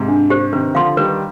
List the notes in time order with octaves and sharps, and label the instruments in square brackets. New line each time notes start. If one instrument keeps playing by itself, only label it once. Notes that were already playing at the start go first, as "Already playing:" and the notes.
Already playing: [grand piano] G#2 C3
[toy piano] D4
G4 C5
[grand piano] C3 D#3 [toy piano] B4
[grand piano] D3 F3 [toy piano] F5 C6
[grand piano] D#3 G3 [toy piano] B4